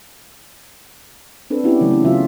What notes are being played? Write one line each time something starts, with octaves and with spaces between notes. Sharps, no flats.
C4 D4 A4 B4
B3 C#4 D4 E4 F#4 G4
C#3 E3 F#3 A3
C#4
C#3 E3 F#3 F4 F#4 E5